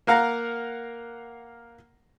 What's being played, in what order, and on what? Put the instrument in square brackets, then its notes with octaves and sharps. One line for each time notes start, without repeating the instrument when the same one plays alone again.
[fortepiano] A#3 A#4 F5 F#5 A#5